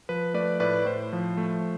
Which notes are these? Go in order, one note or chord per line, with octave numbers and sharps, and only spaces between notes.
F3 B4
A3 B4 D5
A2 B4 D5
A2 C5
F3
A3